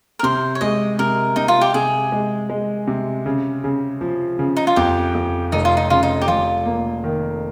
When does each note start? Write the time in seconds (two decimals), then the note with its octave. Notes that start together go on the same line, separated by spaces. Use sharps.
0.19 A#4
0.23 C3 C5
0.55 C#5
0.61 G#3 D#5
0.99 C3 A#4
1.36 C3 D#4
1.48 F4
1.61 G4
1.74 C3 G#4
2.12 G#3
2.50 G#3
2.87 C3
3.26 C#3
3.64 C#3
4.01 F3
4.39 C#3
4.57 D#4
4.67 F4
4.76 F2 G4
5.15 F2
5.52 F1 D#4
5.65 F4
5.77 D#4
5.90 C#3 F4
6.03 D#4
6.22 G4
6.28 F1 F4
6.65 A#3
7.04 D#3